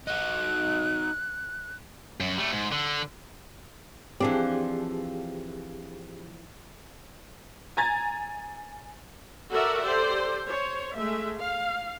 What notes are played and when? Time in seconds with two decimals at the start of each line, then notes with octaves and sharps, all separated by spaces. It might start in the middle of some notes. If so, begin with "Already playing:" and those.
0.07 D#4 F#4 F#6
2.20 F#2
2.38 G3 A3
2.53 G#2
2.72 D3
4.20 E3 F3 C4 D4 G4 G#4
7.77 G#5 A#5 G#6 A6
9.51 F#4 A4 A#4 D5 E5 F#5
9.82 G4 A4 C5 D5
10.46 C5 C#5
10.95 G#3 A3 E5
11.38 F5